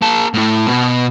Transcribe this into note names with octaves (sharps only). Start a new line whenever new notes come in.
A#3 A5
A2 A3
B2